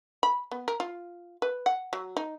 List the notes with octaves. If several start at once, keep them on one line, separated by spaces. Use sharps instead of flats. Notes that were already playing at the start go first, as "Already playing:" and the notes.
B5
B3
A#4
F4
B4
F#5
F#3
D#4